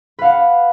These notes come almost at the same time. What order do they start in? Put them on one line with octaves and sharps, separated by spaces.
B4 F5 F#5